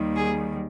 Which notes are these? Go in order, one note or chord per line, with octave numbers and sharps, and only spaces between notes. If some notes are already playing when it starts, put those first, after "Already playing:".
Already playing: D#2 D#3 G3
G#4